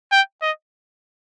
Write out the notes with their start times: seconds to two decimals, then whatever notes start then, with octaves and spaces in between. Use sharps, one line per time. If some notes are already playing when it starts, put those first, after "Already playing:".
0.12 G5
0.42 D#5